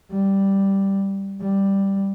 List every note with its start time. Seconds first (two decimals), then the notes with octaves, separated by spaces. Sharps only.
0.11 G3
1.41 G3